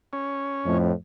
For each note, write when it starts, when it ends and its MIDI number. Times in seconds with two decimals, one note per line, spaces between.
0.13 0.78 61
0.66 0.93 41
0.66 0.93 45